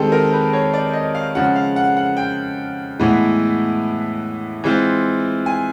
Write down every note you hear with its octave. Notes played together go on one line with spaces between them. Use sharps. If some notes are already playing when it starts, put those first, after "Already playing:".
Already playing: D#3 G#3 C4 G4 A4
A#4
B4
C#5
D5
D#5
F5
C#3 F3 G#3 F#5
F5
F#5
F#5
G5
A2 E3 G#3 B3
E3 G#3 C4 F4
G#5